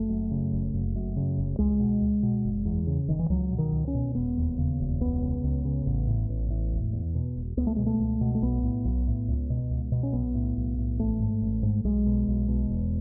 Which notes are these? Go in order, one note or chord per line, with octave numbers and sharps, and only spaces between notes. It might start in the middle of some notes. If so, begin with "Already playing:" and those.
Already playing: F#1 A3
F#2
C#3
F#1
F#1
F#2
C#3
F#1
C#2 G#3
B2
C#2
B2
F#1
E2
C#3
F#1 D#3
E3
C#2 F#3
B2
D#3
C#2
C#4
B2
E1 B3
D#2
C#3
E1
C#2 B3
C#3
C#2
C#3
A1
A2
A1
A2
E1
E2
B2
E1
C#2 B3
A3
B2 G#3
A3
C#2
B2
A3
B1 B3
A2
B1
A2
C#2
B2
C#2
B2
C#4
B1 B3
A2
B1
A2
A1 A3
G#2
A1
G#2
B1 G#3
B2
B1
B2
E1